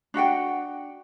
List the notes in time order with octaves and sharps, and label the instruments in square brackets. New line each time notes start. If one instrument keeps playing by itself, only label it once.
[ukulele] D4 F#4 F#5 G5